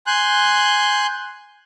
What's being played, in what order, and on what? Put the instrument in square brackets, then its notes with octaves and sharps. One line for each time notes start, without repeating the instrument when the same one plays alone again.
[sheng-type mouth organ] G#5 C6 F#6 G6